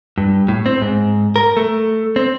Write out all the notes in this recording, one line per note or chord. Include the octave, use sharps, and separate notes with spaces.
G2
A2
C4
G#2
A#4
A3
C4